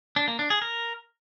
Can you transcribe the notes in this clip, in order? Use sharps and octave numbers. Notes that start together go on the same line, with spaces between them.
D4
A#3
D4
G#4
A#4